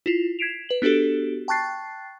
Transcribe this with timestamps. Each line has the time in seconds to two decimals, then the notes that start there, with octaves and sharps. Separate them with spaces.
0.06 E4 F4 C7
0.39 G#6 B6 C7 D7 E7 F7
0.69 B4 F#7
0.82 B3 D4 F#4 G4 A4
1.48 G5 A5 C#6 F#6 A6 C7